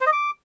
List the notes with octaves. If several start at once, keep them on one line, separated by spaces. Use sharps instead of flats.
C5
D#5
D6